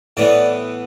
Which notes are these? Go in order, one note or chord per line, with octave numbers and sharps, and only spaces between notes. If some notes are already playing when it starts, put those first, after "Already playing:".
A2 E3 B3 D5